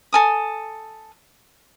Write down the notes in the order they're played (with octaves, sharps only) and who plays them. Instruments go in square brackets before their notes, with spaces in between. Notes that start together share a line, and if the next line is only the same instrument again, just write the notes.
[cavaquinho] A4 G#5 D#6